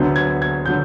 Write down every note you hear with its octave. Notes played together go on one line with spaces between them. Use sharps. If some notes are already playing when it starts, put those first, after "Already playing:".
Already playing: D2 D3 F#3 B3 G6
G#6
G#6
D3 F#3 G6